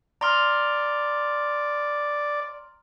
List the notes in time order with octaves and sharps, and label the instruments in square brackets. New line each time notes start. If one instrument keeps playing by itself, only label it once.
[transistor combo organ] D5 [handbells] A#5 C6 F6